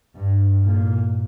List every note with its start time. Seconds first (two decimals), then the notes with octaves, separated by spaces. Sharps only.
0.16 G2
0.63 A#2